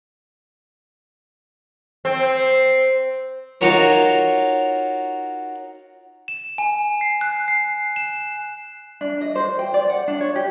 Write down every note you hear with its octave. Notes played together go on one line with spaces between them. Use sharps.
C4
D#4 F4 F#4 A#4 C#5
E7
G#5
C7
F#6
C7
E7
D4
D#5
C5
G5
D5
F#5
D4
C#5
G4